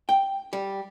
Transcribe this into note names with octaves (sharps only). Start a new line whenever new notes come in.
G5
G3